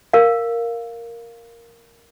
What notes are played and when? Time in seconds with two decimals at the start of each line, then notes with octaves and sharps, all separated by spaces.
0.13 A#4 F5